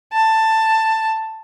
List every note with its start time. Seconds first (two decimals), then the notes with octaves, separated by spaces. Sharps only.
0.13 A5